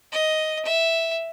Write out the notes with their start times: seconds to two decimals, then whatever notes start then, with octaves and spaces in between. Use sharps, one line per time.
0.12 D#5
0.65 E5